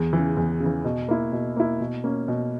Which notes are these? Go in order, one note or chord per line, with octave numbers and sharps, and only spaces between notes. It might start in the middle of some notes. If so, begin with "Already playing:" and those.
Already playing: E2
C#3 E3
E2
C#3
E3
B2
A#3 E4
B2
A#3 E4
B2
A#3 C#4
B2